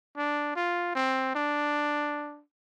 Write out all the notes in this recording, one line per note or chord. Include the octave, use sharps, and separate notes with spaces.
D4
F4
C4
D4